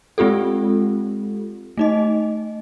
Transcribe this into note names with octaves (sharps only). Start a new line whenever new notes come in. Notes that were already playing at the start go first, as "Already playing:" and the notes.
G#3 C4 F4 G4 A4
A3 D#4 D#5